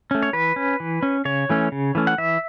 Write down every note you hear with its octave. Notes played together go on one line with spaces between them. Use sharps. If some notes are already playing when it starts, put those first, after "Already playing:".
A3 C#4
C#5
E3 B4
C#4
E3
C#4
C#3 C#5
E3 A3 C#4
C#3
E3 A3 C#4
F#5
E3 E5